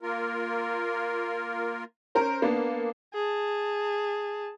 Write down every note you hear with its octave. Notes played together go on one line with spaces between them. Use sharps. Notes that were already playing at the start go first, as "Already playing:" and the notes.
A#3 F4 A#4
C#4 A#4 C5
A#3 B3 D4
G#4 A5